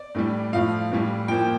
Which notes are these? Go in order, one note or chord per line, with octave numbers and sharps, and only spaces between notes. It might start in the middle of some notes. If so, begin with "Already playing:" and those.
Already playing: D5
A2 E3 G3
A2 F3 F5
A2 E3 G3
A#2 F3 G5